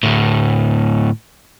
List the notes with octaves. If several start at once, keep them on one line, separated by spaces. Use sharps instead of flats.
D2 A2